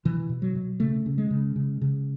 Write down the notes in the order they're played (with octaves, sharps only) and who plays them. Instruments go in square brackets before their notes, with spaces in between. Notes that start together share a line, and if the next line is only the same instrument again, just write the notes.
[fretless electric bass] B2 E3
B2
F#3
B2
C#3 A3
C#3
G#3
C#3
C#3
C#3